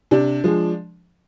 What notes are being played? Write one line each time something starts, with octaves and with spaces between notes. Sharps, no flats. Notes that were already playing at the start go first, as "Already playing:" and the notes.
C3 D4
F3 G#3